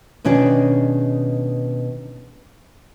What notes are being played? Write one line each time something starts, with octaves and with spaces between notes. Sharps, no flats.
B2 D#3 C#4 D4 G#4